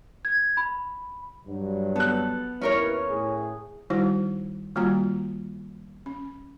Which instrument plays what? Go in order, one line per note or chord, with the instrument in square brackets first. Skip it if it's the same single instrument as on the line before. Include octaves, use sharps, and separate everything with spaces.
[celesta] G#6
B5
[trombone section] G2 F#3
[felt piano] B3 F#6 [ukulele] A4
[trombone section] D#2 E4 B4 [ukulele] C#4 A#4 C#5
[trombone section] A2 G#4
[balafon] D#3 G3 D#4 E4 F#4 C5
D#3 G3 A#3 F4 F#4 A#5
C#4